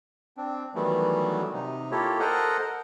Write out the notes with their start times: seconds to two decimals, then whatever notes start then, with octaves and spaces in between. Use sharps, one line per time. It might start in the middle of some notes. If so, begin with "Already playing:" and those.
0.37 C4 D4
0.75 D#3 E3 F#3 G3 A3 B3
1.54 C3 D#4
1.91 A#3 E4 F4 G4 A4 C#5
2.20 A4 A#4 C5 D#5 F#5 A#5